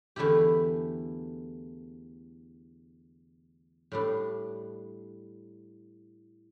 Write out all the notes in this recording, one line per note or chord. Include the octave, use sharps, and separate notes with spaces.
E2 D3 A3 E4 G4
A2 G3 D4